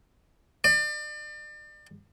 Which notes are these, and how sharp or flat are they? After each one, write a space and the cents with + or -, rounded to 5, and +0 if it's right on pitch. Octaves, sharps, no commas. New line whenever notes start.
D5 +35